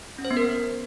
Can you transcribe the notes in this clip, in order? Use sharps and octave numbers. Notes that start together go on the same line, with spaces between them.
C#4
C5
B3
A#4